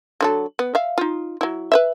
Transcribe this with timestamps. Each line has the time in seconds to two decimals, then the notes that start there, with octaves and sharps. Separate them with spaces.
0.21 D3 F#3 A4
0.59 B3
0.75 E5 F5
0.98 D#4 F4
1.41 F#3 E4
1.72 B4 C5 E5